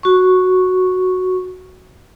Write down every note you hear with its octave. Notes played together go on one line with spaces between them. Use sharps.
F#4 C#6